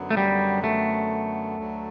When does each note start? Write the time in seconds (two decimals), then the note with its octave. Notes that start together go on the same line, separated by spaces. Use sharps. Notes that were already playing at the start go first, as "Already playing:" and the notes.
Already playing: F#2 D3 F#3 B3
0.10 A3
0.17 G3
0.64 A3
1.57 D2 D3 F#3